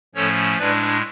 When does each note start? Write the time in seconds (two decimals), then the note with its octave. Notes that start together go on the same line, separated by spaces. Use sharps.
0.15 A2 F3 A3 C#4 A4 C#5
0.58 A2 G#3 D4 B4 D5